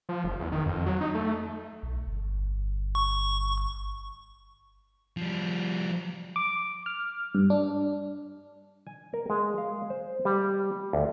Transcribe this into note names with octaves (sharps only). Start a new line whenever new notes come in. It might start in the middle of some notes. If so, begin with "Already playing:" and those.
F3
F#1
E2
D#3
F2
F#3
D#4
A3
B1
G1
C#6
F3 G3
D6
F6
G2
D4
G#5
A#4
G#3
F5
C5
G3
D2